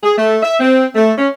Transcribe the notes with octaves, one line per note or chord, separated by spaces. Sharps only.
G#4
A3
E5
C4
A3
C#4